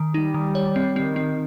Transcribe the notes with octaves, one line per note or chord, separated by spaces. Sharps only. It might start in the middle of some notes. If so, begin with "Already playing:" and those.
Already playing: D#3
G3 D#4
D#3
C#5
C4
D#3 C4
C4